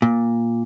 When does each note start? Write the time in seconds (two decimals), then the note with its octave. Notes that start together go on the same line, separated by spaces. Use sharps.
0.02 A#2